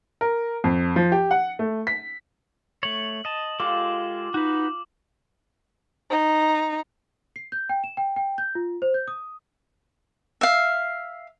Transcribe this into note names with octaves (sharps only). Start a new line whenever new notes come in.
A#4
F2
F3
G4
F#5
A3
B6
A3 C#5 F#7
D#5 A5
G#3 F4 G4 A4 D6
D#4 F#4 B4
D#4
C7
G6
G5
E7
G5
G5
G6
F4
C5
G6
D#6
E5 F5